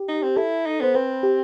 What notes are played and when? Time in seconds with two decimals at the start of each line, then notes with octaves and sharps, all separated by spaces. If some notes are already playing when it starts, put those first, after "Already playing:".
Already playing: G4
0.08 D#4
0.23 C4
0.37 E4 A4
0.66 D#4
0.81 B3 C5
0.95 C4 B4
1.23 G4